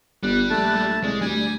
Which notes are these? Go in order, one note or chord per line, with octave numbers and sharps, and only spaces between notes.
G1 G3 F#6
A#1 A3 A5 F#6
C2 G#3 D5
D2 G3 G#5